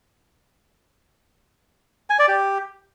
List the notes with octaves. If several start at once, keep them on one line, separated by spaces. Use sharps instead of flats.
G#5
D5
G4